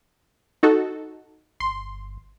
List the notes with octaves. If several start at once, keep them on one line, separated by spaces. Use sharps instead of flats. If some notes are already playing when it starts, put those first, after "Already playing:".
D#4 F#4 A4
G1 C6